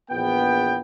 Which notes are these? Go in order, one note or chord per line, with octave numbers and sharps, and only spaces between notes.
A#1 E2 B3 G5